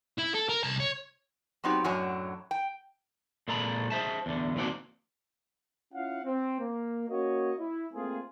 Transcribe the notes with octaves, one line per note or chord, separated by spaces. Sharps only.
E4
A4
A#4
C2 A5
C#5
F#3 B3 C4 D#4 F#4 G4
F#2 A2 F#3 D4 C#5 G#5
G5
A#2 G#3 A4 A#5 B5
G#4 C5 E5 A5
E2 D3
D#3 F3 A#3 C4 F#4 D5
C#4 E4 F4 F5 F#5
C4
A#3
A#3 C#4 F#4 C#5 D#5
E4
A3 A#3 C4 F4 G#4